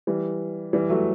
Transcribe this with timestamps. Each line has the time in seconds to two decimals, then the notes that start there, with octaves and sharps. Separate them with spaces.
0.07 E3 G3
0.73 E3 G3
0.90 F#3 A3